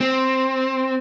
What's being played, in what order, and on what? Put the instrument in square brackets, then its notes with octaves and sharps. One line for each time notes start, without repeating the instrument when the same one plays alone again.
[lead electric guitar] C4